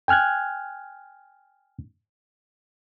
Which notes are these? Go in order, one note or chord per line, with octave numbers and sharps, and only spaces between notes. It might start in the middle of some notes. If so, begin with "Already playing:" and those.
G5 G#5 F6 F#6 G#6